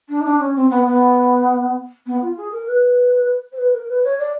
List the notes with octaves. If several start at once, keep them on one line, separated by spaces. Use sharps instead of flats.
D4
D#4
D4
C#4
C4
B3
B3
B3
F4
G#4
A#4
B4
C5
B4
A#4
B4
C#5
D5